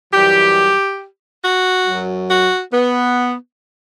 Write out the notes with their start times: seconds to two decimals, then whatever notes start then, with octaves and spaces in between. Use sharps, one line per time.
0.12 F#2 E3 G3 G4
1.43 F#4
1.86 F#2 F#3
2.30 F#4
2.72 B3